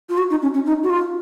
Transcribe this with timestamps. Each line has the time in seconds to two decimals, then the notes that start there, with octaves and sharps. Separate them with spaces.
0.09 F4
0.18 F#4
0.30 D#4
0.42 C#4
0.54 C#4
0.66 D#4
0.83 F#4
0.90 F4